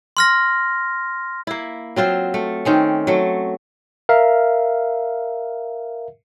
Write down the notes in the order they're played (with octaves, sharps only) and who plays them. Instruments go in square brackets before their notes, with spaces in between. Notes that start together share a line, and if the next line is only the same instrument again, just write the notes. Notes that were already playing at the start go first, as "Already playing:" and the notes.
[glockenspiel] C6 F6 A#6
[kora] A#3 E4
F#3 C4 F4 C5
A3
D#3 C4 C#4
F#3 A3
[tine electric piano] A#4 E5 F5